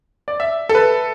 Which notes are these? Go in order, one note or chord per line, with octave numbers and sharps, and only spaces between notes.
D5
E5
A4
B4